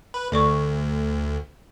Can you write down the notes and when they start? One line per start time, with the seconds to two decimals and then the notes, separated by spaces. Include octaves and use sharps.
0.14 B4
0.32 D2 A4 D5 C#6